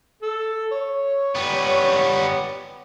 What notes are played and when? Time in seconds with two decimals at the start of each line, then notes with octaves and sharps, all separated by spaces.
0.22 A4
0.72 C#5
1.35 G3 B3